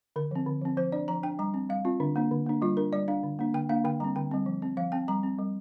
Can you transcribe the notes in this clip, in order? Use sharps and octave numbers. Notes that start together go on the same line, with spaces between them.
D3 A#4
F3 C4
D3
F3 C4
F3 C5
D4 D5
F3 A#5
D4 G5
G3 A#5
C4
G3 F5
C4 F4
D3 D4
A#3 D4
D3
A#3 D4
G3 F4
D4 A#4
G3 D5
D4 F5
D3
A#3 D4
D3 G5
A#3 D4 F5
D3 G5
G3 C4 A#5
D3 G5
G3 C4
F3
C4
F3 F5
C4 G5
G3 A#5
C4
G3